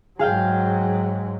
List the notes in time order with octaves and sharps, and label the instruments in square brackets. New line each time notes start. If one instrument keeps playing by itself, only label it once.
[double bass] G#2 F#3 [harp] G#4 F5 G5